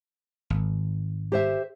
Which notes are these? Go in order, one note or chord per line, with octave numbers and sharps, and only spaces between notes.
G#1
G4 C5 E5